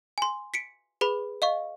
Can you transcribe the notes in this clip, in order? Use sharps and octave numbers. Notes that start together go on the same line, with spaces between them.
G#5 C6
B6 C#7 D7
G#4 B4 B5
D#5 F5 C#6